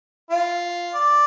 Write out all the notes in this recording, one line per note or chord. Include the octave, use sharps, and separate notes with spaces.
F4
D5